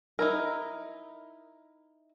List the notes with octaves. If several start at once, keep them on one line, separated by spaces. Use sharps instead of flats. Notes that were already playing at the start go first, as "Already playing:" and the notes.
D#4 E4 A#4